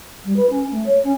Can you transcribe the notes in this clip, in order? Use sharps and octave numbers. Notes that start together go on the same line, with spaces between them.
G3
B4
C#4
A3
C#5
C#4